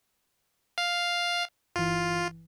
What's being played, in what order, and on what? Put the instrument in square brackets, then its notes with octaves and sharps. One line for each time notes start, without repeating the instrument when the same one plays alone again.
[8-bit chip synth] F5
[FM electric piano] G1 E3 [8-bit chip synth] F4